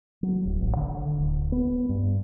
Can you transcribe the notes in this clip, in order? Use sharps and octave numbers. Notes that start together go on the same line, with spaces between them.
F#3
D1
A1
D3
D1
B3
G2